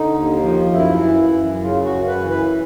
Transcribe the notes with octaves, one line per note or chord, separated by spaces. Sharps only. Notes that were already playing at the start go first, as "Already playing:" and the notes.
Already playing: D3 D#4
D#2
F3
F#2 E4
E3
F#2
C#3 F4
F#4
F#2
B4
E3
B4